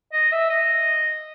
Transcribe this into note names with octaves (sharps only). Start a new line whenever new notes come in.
D#5
E5
D#5